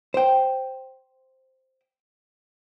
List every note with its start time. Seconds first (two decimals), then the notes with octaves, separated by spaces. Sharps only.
0.14 C5 G5